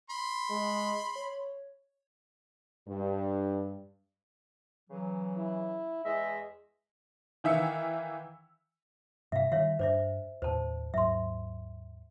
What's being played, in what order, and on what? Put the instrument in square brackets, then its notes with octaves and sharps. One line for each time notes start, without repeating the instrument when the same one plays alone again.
[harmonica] B5 C6
[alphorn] G#3
C#5
[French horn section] G2
[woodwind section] C#3 E3 F#3
[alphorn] E4
[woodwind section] E2 D#5 E5 [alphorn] G#3
[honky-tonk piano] D#3 E3 E5 F5 E6 C#7
[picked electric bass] G2 C3 [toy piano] E5 F5
[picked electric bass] D#3 G3 [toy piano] C#5 E5 F5
[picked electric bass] G2 D4 [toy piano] C5 D5 E5
[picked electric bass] D#2 A2 [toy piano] C5 A5
[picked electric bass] D#2 G#2 F#3 [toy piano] E5 C6